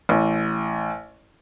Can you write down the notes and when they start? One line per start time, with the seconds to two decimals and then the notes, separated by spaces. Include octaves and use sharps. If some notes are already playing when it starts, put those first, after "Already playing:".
0.09 A1